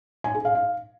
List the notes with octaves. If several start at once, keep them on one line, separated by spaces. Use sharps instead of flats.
G#5
G#4
F5
F5